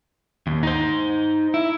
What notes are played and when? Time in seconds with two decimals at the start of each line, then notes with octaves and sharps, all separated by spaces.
0.47 D#2
0.63 D#4 C5
1.54 E4